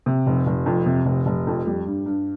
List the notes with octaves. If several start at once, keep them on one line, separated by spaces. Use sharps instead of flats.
C3
F1
F1
F2
C3
F1
F1
F2
G3
G2
G2